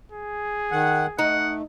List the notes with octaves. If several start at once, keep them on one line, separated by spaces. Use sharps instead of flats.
G#4
D#3 F#5
A3 D#4 F#5